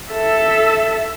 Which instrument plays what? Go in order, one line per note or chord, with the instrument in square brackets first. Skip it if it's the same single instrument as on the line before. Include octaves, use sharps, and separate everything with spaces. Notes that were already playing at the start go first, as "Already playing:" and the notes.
[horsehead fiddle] A4 E5